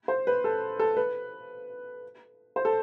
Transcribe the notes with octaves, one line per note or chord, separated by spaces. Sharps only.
C5
B4
A4
A4
B4
C5
A4